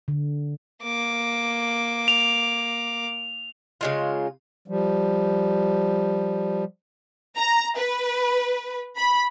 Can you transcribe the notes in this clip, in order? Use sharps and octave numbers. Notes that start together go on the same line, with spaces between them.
D3
A#3 D6
F7
C#3 G#3 F4
F3 G3
A#5
B4
B5